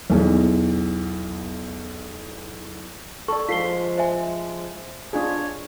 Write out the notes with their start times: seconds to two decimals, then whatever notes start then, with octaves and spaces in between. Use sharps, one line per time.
0.10 B1 E2
3.28 A4 D5 C#6
3.49 F3 G#3 F4 A4 B6 C7 G7
3.98 C5 E5 G#5
5.13 D4 F4 G#4 C#5